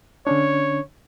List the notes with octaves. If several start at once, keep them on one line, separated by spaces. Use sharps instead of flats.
D3 C#4 D4 C#5